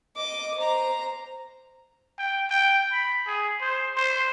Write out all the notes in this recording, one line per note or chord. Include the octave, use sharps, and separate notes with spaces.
D#5 D6
C5 A#5
G5
G5
B5
G#4
C5
C5